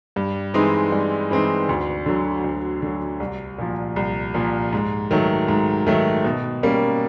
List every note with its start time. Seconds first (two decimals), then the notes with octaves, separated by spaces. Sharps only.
0.16 G2
0.54 E3 G#3 C4 D#4
0.92 G2
1.31 E3 G#3 C4 D#4
1.69 D2
2.06 D3 F#3
2.44 D2
2.82 D3 F#3
3.20 C2
3.58 A#2 F3
3.96 C2
4.34 A#2 F3
4.73 G#2
5.11 D#3 F#3 A3
5.48 G#2
5.87 D#3 F#3 A3
6.24 B2
6.63 G3 A#3 C#4